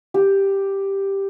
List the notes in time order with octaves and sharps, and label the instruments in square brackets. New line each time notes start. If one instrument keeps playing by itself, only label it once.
[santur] G4